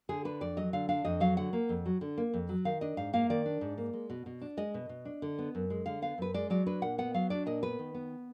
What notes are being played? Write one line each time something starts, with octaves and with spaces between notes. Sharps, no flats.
D3 G#4
D4 B4
F2 D5
F#3 D#5
D3 F5
D4 F5
F2 D#5
F#3 F5
D3 F#5
A#3
F2
F#3
D3
A#3
F2
F#3
D#3 F5
D4 D#5
G#2 F5
A#3 F5
D#3 D5
D4
G#2
A#3
G#3
B2
B2
D4
G#3 D#5
B2
B2
D4
D3
B3
F#2
G#3
D3 F5
B3 F5
F#2 B4
G#3 D5
F#3 D5
D4 B4
A#2 F#5
B3 F#5
F#3 F5
D4 D5
A#2 D#5
B3 B4
D#3
B3